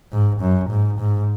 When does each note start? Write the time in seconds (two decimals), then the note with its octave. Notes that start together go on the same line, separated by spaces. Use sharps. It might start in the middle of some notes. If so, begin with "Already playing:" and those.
0.12 G#2
0.41 F#2
0.70 G#2
0.99 G#2